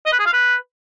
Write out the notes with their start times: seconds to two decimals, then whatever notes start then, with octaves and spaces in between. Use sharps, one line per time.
0.05 D#5
0.12 B4
0.19 G#4
0.26 F5
0.33 B4